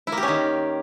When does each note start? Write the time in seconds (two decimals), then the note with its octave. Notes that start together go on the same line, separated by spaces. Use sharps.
0.07 E4
0.12 A#3
0.17 G4
0.23 C#4
0.28 D#3